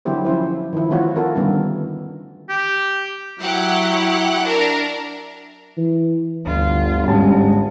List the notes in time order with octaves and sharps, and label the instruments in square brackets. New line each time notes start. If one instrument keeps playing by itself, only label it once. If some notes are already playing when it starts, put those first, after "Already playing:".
[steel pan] D3 F#3 C4 E4 G4 C5
F3 C#4 E4 C5
D#3 F3 E4
E3 A3 C4 F4 F#4 C#5
C4 F4 F#4 A4 A#4
D3 D#3 G3 A3 B3 C#4
[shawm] G4
[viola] F#3 E4 [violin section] G4 F#5
[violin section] D4 A#4
[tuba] E3
[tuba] G1 [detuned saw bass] D2 [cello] F4
[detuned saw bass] G#2 [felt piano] G3 C#4 A5 [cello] G#3